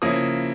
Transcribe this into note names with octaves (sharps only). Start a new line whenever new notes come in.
C#3 F3 A#3 C#4 E4 D#6